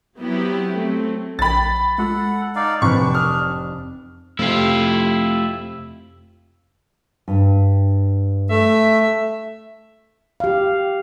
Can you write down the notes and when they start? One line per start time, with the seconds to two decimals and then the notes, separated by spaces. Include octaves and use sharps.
0.18 F#3 B3 C4 E4 G4
0.76 F#3 A3 C4
1.39 A#1 G5 B5 A6
1.98 G#3 F4 A4 F#5
2.55 D#4 D5 F5
2.82 F1 A2 E3 C4 D4 B5 C#6
3.15 D#6 F6
4.39 F2 C3 A3 E4 F4 G4
7.28 G2
8.50 A3 E5
10.40 G4 F5